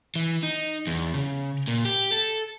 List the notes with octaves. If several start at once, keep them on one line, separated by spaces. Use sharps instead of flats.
E3
D#4
E2
C#3
A#2
G4
A4